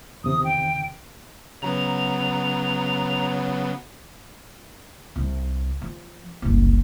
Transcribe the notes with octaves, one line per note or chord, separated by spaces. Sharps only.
E2 C3 D#3 D#6
G5
C#3 F#3 B3 A#5
C2
F3
F#1 C2